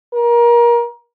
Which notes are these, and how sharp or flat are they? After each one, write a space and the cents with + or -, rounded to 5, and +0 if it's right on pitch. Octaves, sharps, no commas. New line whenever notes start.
A#4 +25